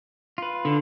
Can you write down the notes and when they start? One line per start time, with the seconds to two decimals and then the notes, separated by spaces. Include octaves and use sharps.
0.38 F4 B4
0.65 D3